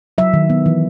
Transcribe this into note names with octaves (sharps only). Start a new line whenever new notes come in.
F#3 E5
D#3
B3
E3